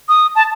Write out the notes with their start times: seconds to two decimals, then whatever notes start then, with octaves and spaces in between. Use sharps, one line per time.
0.09 D#6
0.36 A5